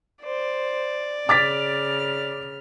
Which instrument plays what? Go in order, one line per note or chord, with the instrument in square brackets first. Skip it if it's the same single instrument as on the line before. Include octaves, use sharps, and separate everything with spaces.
[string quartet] C5 [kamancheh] D5
[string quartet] C#3 F6 [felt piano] D6 A6 B6